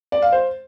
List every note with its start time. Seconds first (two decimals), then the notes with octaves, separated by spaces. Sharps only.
0.12 D5
0.22 F5
0.32 C5